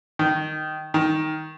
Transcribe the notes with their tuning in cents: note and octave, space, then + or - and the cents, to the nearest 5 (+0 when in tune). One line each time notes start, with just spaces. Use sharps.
D#3 -10
D#3 +5